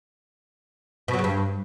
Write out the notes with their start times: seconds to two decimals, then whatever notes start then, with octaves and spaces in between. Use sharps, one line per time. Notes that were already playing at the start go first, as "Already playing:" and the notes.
1.08 B2
1.13 F#3
1.19 C#3
1.24 G2